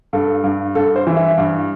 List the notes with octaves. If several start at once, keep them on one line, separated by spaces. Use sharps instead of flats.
G2 A4
G2
G2 A4
C5
E3
E5
G2